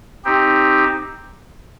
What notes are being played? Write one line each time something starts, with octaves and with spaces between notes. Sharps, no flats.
C4 D#4 G4